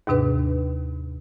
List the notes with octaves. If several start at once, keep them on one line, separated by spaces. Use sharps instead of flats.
D#2 G#2 C3 D4 B4